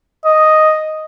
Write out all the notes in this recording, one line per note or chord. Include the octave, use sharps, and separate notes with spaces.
D#5